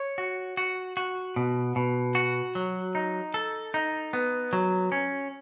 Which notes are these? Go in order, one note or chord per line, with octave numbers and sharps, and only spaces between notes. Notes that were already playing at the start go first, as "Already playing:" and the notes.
Already playing: C#5
F#4
F#4
F#4
B2
B2
F#4
F#3
D#4
A4
D#4
B3
F#3
C#4